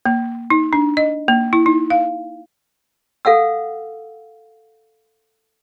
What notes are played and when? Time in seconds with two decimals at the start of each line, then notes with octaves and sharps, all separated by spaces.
0.06 A#3
0.50 D#4
0.73 D4
0.97 D#5
1.28 A#3
1.53 E4
1.66 D#4
1.90 F5
3.25 A4 F5 F#5 E6